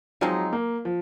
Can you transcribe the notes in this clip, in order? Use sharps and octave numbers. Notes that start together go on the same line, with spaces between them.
F3 F#3 G#3 C4 D#4
A#3
F3